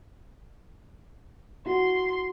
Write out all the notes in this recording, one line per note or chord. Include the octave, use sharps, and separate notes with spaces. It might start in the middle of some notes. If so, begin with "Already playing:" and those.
E4 F#4 C6